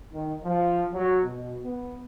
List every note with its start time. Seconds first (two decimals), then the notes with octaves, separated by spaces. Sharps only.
0.13 D#3
0.45 F3
0.94 F#3
1.24 B2
1.65 B3